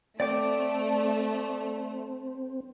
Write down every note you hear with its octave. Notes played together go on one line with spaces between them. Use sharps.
A3 C4 D5 G5 D6